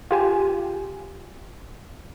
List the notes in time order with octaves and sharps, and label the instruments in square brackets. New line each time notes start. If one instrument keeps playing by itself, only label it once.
[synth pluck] F4 G4 G#5